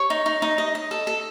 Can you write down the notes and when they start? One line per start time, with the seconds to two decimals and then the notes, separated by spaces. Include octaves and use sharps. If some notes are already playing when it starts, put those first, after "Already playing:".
Already playing: C#5 C#6
0.10 D#4
0.26 D#4
0.42 D#4
0.58 D#5
0.75 D#5
0.91 A4
1.07 A4